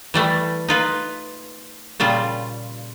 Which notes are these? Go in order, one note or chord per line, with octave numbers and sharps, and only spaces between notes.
E3 G3 A3
D#4 F4 B4
A#2 C#3 G3 F4